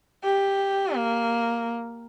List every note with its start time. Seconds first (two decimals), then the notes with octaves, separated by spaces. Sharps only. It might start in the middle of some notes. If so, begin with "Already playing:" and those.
0.24 G4
0.96 A#3